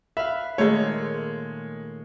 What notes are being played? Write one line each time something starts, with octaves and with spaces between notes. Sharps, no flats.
B4 E5 F5
A#2 D#3 G#3 A3 C#5